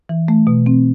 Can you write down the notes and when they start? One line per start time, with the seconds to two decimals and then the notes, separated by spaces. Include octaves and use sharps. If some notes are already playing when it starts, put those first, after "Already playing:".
0.09 E3
0.28 A3
0.47 B2
0.66 C4